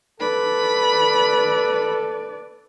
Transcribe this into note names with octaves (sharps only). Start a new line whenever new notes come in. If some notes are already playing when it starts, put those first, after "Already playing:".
A4 B4 D5 B5